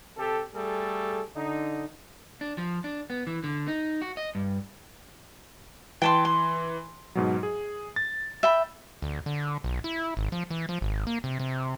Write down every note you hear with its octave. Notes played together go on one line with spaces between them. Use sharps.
C3 G4 A4
G3 A3 G#4 A4
D3 D#4
D4
F3
D4
B3
E3
D3
D#4
F#4
D#5
G2
E3 G5 A5 C6
C6
G#2 B2 F#3
G#4
A6
E5 G5 B5
D2
D3
B1
E4
G#1
F3
E3
F3
G#1
A#3
C3
C3